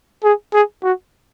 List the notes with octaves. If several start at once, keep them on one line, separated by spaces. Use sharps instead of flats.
G#4
G#4
F#4